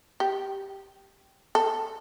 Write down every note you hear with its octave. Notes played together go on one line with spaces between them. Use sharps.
G4
A4